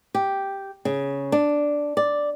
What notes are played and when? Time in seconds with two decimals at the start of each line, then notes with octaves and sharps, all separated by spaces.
0.15 G4
0.85 C#3
1.32 D4
1.97 D5